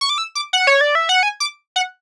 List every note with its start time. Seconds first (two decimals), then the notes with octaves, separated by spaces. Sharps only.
0.01 C#6
0.10 D6
0.18 E6
0.35 D6
0.53 F#5
0.67 C#5
0.81 D5
0.95 E5
1.09 F#5
1.23 G#5
1.40 D6
1.76 F#5